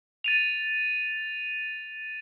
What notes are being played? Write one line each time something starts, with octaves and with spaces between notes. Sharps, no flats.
A6 D#7 F7